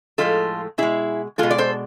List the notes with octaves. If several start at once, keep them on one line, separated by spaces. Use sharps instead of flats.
A2 F3 G#3 F4 A4
B2 G#3 E4 G#4
B2 G#3 F4 A4
D5
A4 C5